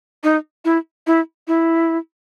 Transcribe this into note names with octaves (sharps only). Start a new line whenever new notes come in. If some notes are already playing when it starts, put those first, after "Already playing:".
D#4
E4
E4
E4